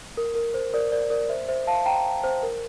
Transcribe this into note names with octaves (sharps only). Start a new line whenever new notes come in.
A#4
A#4
C5
A#4 D5
A#4 D5
A#4 D5
C5 E5
C5 E5
F5 A5
G5 A#5
C5
A#4